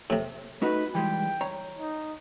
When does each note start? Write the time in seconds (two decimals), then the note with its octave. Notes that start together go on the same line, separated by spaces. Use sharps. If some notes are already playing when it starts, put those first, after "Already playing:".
0.10 A2 C3
0.62 A3 D#4 F#4 B4
0.95 E3 G3 G#3 G5
1.41 C#5 A#5
1.79 D#4